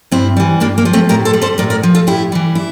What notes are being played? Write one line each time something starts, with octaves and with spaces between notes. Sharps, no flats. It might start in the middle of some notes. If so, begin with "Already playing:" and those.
G2 C4 E4
E3 G3
G2 A#3 D4
A#3
F3
A3 C4
A2 G4 A#4
A4 C5
G3
A4 C5
A2 A#4 D5
A#4 D5
F3
F4 A4
A2 E4 G4
E3 G3
E4